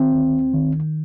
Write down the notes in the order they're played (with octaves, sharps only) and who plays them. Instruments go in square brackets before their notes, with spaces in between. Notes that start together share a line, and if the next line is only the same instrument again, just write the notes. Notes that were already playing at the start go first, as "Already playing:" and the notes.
Already playing: [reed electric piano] D#3 C4
D2
D#3